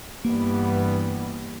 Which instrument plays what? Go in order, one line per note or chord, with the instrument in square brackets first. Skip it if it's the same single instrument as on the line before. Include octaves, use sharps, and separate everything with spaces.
[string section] G2 E3 G3 B3 [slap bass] A#3